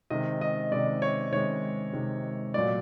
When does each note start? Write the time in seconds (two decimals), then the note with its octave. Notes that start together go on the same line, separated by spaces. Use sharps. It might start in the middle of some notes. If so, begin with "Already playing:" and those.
0.10 C3 D#3 G#3 D#5
0.41 D#5
0.71 C3 D#3 G#3 D5
1.02 C#5
1.32 C3 D#3 G#3 C#5
1.93 C3 D#3 G#3
2.54 A#2 F#3 A3 D5